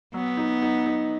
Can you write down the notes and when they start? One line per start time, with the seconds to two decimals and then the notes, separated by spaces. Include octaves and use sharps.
0.14 F#3 B3
0.37 D#4
0.62 D#4
0.86 D#4